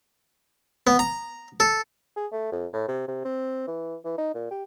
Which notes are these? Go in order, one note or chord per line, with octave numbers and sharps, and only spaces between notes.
B3
A#5
A4
G#4
A3
F2
A2
C3
C3
C4
E3
E3
D#4
A#2
G4